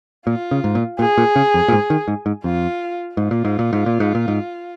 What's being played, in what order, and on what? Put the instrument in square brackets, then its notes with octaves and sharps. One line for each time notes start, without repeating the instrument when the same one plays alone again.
[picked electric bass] A#2 [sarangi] F4
[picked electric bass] C#3
G#2
A#2
[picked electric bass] A#2 [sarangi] G#4
[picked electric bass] A#2
C#3
F2
A#2
G#2
D#3
G#2
G#2
[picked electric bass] F2 [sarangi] F4
[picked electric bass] G#2 [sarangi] F4
[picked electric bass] A#2
G#2
A#2
G#2
A#2
G#2
A#2
G#2